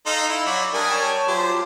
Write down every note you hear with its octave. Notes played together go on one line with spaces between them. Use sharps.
D#4 A4 F5 C6
E4
F#3 F#4 D5 B5
G3 D4 A#4 G#5 D#6
C#5 G5 A5
F#3 F4 G4 C5